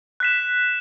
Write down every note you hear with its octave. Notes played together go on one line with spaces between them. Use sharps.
F#6 B6 E7